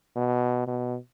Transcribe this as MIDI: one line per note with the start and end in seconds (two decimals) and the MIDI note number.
0.16 0.65 47
0.67 0.97 47